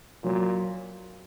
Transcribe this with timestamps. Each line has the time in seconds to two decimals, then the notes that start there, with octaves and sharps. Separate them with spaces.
0.24 A#2 F#3